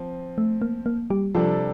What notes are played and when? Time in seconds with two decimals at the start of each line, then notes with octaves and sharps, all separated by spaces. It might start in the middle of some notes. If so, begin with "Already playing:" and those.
Already playing: F3 C4
0.38 A3
0.62 A#3
0.86 A#3
1.10 G3 G4
1.35 C3 F3 G3 D4 F4 A4